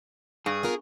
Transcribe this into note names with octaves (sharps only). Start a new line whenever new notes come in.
G2 G#4
B3 F4 A#4